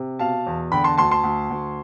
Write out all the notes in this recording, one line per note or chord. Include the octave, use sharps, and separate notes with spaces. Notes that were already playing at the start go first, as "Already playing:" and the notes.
Already playing: C3
B2 F5 A5
E2
D3 G5 B5
A5 C6
D2 A5 C6
A5 C6
D2
D2